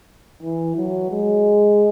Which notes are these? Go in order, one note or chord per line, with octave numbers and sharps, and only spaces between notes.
E3
F#3
G#3